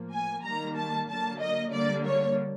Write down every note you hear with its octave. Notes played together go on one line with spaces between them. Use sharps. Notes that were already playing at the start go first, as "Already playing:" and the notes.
Already playing: A2 F3 A#3
G#5
D#3 G3 A#3 A#5
A5
D3 F#3 A#3 A5
D#5
D3 G3 A#3 D5
C#5